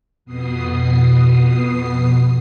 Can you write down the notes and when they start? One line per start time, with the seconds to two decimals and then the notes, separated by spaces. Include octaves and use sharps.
0.25 F2 B2 B3 D#6 C7